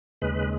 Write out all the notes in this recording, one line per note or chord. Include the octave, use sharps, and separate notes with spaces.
D#2 C#3 G#3 B4